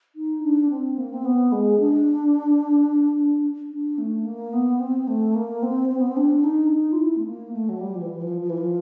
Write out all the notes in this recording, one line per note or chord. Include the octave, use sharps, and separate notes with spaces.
D#4
D4
C4
A#3
C4
B3
G#3
D4
D4
A3
A#3
B3
C4
A3
A#3
C4
C4
B3
C4
D4
D#4
D4
D#4
F4
E4
A3
A#3
A3
F#3
G3
F3
E3
F3
F3
E3
F3